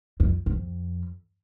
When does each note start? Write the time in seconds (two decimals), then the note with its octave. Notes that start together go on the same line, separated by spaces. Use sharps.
0.20 F2
0.46 F2